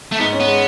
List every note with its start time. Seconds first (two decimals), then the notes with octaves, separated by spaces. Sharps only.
0.12 A3
0.19 G#2 B3
0.32 C#4
0.40 B3
0.47 G#3